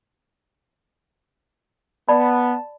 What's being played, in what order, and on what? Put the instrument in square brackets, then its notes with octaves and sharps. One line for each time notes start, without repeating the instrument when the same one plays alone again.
[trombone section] B3 [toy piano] D5 B5 [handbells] A5